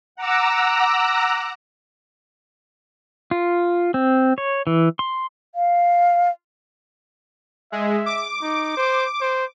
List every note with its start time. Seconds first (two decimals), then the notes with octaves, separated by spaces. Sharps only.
0.15 F#5 A#5 D6 E6
3.31 F4
3.94 C4
4.38 C#5
4.67 E3
4.99 C6
5.55 F5
7.72 G#3 E5
8.06 D6
8.42 D#4
8.77 C5
9.21 C5